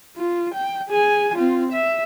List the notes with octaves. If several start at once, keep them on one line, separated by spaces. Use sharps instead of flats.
F4
G5
G#4 G#5
C4 F4
E5